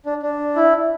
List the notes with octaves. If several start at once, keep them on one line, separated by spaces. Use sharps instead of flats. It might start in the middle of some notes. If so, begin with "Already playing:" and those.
D4
D4
E4